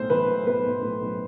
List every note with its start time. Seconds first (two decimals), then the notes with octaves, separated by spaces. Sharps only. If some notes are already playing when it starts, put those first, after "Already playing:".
Already playing: B1 A2 C5
0.10 E3 B4
0.28 A2
0.47 B1 B4
0.66 B1
0.83 A2
1.02 B1